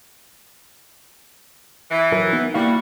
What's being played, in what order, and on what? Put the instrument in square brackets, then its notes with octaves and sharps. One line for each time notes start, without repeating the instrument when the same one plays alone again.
[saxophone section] E3
[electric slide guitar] F#3 A#4
B3 D#4
[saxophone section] G3 F#4 [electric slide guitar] A#3 E4 F5